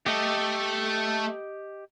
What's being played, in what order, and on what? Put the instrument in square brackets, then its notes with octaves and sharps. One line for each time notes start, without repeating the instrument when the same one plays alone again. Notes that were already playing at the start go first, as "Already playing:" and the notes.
[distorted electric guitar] A3 A4 [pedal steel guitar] G4 D#5